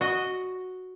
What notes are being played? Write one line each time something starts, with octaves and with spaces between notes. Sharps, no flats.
F#4 D#5